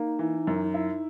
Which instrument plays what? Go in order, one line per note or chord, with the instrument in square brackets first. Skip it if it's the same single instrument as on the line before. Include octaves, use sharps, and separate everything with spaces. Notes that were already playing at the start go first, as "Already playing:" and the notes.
Already playing: [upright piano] A#3 [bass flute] D#4
[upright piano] E3
F#2
E4